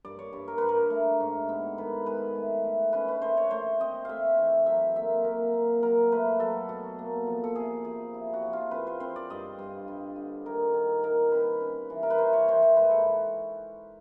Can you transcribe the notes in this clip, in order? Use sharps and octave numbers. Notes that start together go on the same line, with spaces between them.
G2 D5
C#5
G2
A#4
G2 B4
A#4
A3
G#2
B3
D#3 B4
G#3 B4
A3
A3
C#4 B4
B4
A3 C5
C#5
A3 C5
C4 D#5
A3 E5 F5
E3
F#3 E5
A#3 E5
A#3 A#4
A#3
F#3 A#4
A3 B4
F#3 A4
B2
A#3
F3
A4
C3 G#4
F3 G#4
E4
F#4
F3
F4
C4 B4
C5
C4 C5
D5
G2 D#5
G2
G2
D3
D#3 A#4
D#3
D#4 A#4
C4 B4
C#4
E3
A#4
B4
E3 C5
C#5
E3 C5
C5
G#2 B4
A4